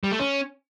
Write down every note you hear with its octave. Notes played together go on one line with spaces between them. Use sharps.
G3
A3
C#4